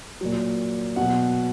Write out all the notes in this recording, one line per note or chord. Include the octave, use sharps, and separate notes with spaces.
A#2 F#3
B2 F#3 F#5